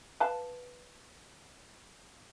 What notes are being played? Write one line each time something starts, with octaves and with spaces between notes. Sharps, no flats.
B4 F5 A5